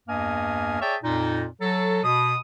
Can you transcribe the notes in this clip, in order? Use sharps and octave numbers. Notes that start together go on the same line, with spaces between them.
E2 G2 A#3 D#5 G#5 F6
G#4 C#5 D5 E5 G5 A5
F2 A#2 D#4
F#3 A4
B2 D#6